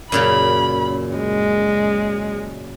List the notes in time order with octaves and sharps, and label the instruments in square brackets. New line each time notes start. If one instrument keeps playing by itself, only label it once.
[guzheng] F#2 A#2 C#3 [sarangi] B5
[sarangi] G#3